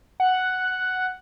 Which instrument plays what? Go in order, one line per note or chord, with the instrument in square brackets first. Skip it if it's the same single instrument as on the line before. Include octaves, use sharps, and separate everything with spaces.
[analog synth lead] F#5